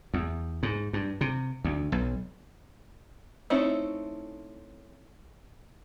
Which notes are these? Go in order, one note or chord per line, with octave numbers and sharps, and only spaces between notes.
E2
G#2
G2
C3
D2
B1
A3 C4 C#4 D#4 E4